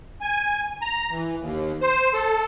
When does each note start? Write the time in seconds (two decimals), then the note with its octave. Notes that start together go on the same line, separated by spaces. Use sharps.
0.21 G#5
0.82 A#5
1.11 E3
1.40 D#2
1.81 C5
2.14 A4